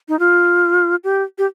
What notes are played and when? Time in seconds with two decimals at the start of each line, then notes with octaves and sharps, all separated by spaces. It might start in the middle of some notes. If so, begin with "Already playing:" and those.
0.09 D#4
0.19 F4
1.04 G4
1.38 G4